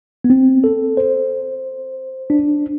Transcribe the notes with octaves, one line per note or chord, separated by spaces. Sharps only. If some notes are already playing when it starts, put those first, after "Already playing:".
B3
C4
A4
C5
D4